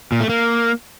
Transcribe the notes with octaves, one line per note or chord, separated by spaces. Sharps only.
A#2
A3
A#3